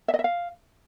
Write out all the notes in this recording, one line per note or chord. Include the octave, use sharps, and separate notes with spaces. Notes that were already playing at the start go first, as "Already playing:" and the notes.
E5
D#5
E5
F5